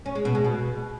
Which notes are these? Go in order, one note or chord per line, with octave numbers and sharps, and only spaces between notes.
C#4
G#3
B2
G#3
B2